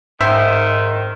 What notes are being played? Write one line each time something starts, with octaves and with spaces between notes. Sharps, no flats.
G#2 D#3 C5 E5